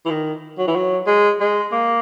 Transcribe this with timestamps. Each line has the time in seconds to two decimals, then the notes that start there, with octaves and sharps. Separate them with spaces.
0.06 E3
0.10 D#3
0.58 F#3
0.68 E3
0.75 F#3
1.07 G#3
1.40 G#3
1.72 A#3